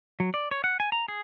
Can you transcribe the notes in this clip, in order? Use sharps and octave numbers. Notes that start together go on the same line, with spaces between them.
F#3
D5
C#5
F#5
G#5
A#5
G#4